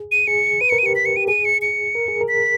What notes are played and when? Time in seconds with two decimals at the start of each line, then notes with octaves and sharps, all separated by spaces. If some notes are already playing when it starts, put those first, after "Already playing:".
Already playing: G#4
0.12 D#7
0.27 G#4 C#7
0.61 B4 D#7
0.69 C#7
0.72 A#4
0.79 D#7
0.83 G4 C#7
0.95 B6
1.05 C#7
1.16 G4 D#7
1.28 G#4 D#7
1.45 C#7
1.62 C#7
1.95 A#4
2.08 G#4
2.21 A#4
2.28 B6